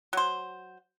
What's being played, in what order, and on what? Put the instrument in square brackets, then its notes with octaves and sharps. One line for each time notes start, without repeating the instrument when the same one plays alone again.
[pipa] F#3 C5